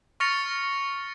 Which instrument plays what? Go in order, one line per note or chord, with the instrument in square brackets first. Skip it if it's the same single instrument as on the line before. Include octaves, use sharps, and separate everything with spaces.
[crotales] C#6 F6 A6 A#6 C#7 F7